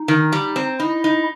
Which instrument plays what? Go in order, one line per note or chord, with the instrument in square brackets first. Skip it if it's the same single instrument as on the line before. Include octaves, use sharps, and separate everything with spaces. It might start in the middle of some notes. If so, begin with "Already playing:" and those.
Already playing: [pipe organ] D#4
[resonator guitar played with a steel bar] D#3
G3
C4
[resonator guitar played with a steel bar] D#4 [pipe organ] E4
[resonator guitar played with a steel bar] D#4